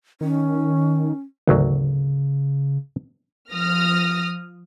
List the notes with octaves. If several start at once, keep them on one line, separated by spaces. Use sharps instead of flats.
D#3 C#4
G#1 D2 C#3 F#3
F3 D#6 F6 A#6